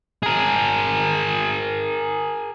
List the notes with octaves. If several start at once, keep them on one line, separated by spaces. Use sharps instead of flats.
G#4 A#4